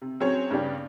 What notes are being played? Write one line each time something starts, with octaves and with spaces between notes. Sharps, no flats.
C3
F#3 C4 C#4 G#4 C#5
G2 C#3 B3 D4 G4